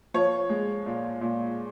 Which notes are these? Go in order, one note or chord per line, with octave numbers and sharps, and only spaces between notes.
F3 C#5
G#3
A#2
A#2